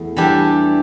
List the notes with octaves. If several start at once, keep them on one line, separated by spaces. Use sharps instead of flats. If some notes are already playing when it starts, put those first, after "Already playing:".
Already playing: E2 A3
E3 G3 D4 G4